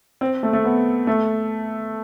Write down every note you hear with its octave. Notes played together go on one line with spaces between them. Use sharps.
C4
A3
A3
B3
A3